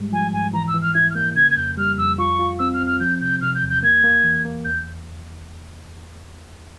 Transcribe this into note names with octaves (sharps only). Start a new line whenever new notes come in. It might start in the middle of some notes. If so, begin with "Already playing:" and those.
Already playing: G#2 G3 G#3
F3 G#5
G#2 G#5
E3 A#5
E6
E3
F6
E4 G#6
F6
A#3 G6
C#3 G#6
G#6
F2 G6
G3 F6
F2 E6
F4 C#6
F4
C4 E6
F6
C4
F6
F3 G6
C3 G6
C3 F6
G6
E2
G6
A#3 G#6
A#3
E3
A#3
E2 G6